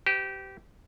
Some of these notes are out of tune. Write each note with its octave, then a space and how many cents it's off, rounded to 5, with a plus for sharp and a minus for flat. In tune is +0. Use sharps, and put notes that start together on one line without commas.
G4 -20 B4 +45